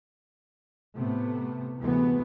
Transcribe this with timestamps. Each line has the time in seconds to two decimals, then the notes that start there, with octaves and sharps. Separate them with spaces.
0.96 A2 C3 A3 B3
1.80 D2 C3 E3 G#3 A3 B3